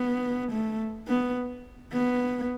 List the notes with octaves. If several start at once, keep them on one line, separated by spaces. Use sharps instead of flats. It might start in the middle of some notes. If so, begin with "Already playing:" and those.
Already playing: B3
A3
B3
B3